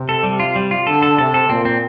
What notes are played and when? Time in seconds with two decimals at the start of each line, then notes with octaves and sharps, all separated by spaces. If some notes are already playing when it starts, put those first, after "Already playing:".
Already playing: C3
0.09 A4
0.23 G3
0.40 F4
0.56 G3
0.71 F4
0.87 D3 A4
1.03 A4
1.18 C3 A4
1.34 A4
1.49 A#2 C4
1.65 C4